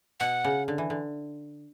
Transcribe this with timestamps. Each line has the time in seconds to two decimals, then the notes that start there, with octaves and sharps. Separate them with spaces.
0.20 B2 F#5
0.44 C#3
0.68 D3
0.78 E3
0.90 D3